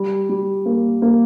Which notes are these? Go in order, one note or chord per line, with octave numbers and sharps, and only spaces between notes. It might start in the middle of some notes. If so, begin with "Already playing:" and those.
Already playing: G3
G3
A#3
A#3